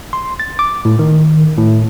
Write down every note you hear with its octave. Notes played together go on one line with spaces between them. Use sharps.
C6
A6
D6
A2
D#3
A2